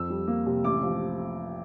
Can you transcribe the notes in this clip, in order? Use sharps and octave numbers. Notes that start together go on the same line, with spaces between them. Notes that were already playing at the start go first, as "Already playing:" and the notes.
Already playing: F2 E6
G3
A#3
C3
A1 D6
F3